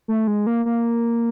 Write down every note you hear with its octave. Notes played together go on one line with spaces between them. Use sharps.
A3
G#3
A#3
A#3